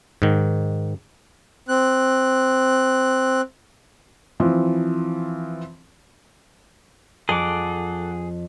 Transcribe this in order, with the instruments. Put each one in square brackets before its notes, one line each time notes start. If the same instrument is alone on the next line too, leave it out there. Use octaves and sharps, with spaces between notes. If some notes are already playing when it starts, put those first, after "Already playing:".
[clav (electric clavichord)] G#2 D#3
[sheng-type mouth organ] C4 F#6
[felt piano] E3 F3 C4
[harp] F2 [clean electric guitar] G#4 [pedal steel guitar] A4 F#5 D6